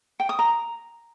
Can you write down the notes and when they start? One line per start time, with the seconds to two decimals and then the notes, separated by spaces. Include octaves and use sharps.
0.20 G5
0.29 D#6
0.39 A#5